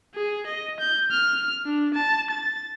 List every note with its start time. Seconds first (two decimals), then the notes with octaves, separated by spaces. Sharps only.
0.14 G#4
0.46 D#5
0.80 G6
1.11 F6
1.65 D4
1.94 A5
2.30 A6